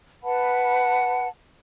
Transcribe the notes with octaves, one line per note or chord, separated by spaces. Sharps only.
B4 F#5 A5 B5